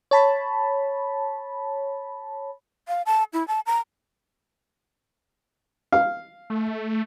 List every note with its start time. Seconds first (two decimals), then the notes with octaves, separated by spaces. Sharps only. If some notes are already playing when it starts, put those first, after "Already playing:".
0.11 C#5 A5 B5
2.88 F5
3.06 A5
3.33 E4
3.48 A5
3.66 A#5
5.92 F5
6.50 A3